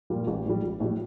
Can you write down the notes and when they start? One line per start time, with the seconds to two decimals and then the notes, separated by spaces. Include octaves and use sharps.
0.10 A#2 G3 A#3
0.27 A1
0.46 A2 G3
0.63 A1
0.80 A2 G3